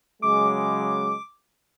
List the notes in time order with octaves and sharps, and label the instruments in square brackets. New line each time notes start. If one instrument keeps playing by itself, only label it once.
[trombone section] C#3 F#3 G#3 [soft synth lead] D6